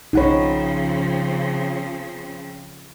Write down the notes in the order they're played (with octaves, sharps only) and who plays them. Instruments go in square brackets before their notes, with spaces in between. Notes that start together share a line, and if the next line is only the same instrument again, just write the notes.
[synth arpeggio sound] B1 F#5 B5 [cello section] C#3 F3 C4 [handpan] D#4 C#5